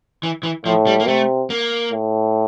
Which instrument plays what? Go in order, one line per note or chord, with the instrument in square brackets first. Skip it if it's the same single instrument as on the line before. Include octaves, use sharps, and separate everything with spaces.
[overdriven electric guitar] E3
E3
[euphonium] A2 [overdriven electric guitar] F3
[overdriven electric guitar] G3
A#3
[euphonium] C3 [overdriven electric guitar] A3
[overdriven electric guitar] A#3
[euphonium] A2